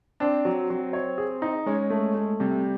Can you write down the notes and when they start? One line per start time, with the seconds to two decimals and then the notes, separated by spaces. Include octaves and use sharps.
0.20 C4 D4
0.45 F#3
0.70 F#3
0.93 C#5
1.18 G#4
1.42 D#4
1.66 G#3 C#4
1.90 A3
2.15 A3
2.40 C3 G3